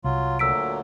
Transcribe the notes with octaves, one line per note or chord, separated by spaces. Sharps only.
C2 F#3 F4
D2 A#2 F#3 E6 B6 D7